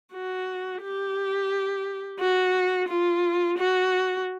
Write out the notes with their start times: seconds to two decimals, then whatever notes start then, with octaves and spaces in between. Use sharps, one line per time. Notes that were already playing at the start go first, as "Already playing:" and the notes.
0.13 F#4
0.82 G4
2.20 F#4
2.88 F4
3.58 F#4